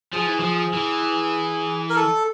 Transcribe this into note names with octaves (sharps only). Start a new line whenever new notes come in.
F3 G#4
E3
F3
E3
A#4
A4